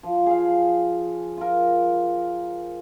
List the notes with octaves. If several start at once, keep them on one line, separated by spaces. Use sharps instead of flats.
F3
G#4 F5
F4 A#4